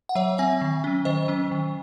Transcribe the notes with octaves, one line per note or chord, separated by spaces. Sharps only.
F#5
F#3 C#5 E5
C4 E5 G#5
D#3
F#3 C#4
D#3 C5 D#5
F#3 C#4
D#3